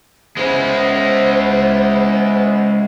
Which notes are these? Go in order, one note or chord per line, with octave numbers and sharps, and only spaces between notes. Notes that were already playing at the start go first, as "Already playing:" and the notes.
G#3 B3 C#4 E4 C5 E5